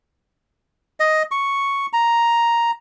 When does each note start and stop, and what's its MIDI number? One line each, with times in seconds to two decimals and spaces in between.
1.00 1.23 75
1.31 1.86 85
1.93 2.71 82